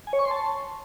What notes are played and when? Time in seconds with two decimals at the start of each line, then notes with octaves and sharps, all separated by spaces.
0.07 G#5
0.13 C#5
0.19 C#6
0.25 C6
0.31 A5